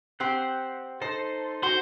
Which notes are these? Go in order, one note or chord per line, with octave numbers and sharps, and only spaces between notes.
C4 G4 C5 F#5 C6
D#4 A4 C5
F#4 C5